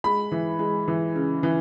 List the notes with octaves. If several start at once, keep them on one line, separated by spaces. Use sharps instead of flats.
G#3 B5
E3
G#3
E3
C#3
E3